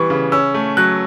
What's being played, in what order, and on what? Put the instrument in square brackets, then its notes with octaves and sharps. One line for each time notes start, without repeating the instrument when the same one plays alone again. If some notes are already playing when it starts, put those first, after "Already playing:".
Already playing: [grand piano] E3 G3 B3 C#6
C#3
C#4 E6
A3
F#3 F#6